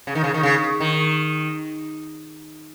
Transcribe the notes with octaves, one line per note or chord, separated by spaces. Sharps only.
C#3
D#3
C#3
D#3
C#3
D#3